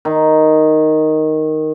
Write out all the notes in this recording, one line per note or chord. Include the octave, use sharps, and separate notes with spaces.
D#3